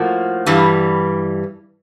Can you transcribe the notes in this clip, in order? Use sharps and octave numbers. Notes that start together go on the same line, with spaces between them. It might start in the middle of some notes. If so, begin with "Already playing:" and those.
Already playing: A2 F3 A#3 F#4
G2 E3 G3